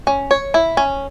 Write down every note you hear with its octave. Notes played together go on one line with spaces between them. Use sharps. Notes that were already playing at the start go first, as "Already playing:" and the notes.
C#4
C#5
E4
C#4